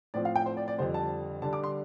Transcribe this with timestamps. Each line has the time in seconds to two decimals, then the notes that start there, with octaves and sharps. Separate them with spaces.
0.14 A2 F3 C4 D5
0.25 F5
0.36 G5
0.46 C5
0.57 D5
0.68 D5
0.78 F2 D3 G3 C5
0.94 A5
1.42 D3 G3 D4 A5
1.53 D6
1.64 C6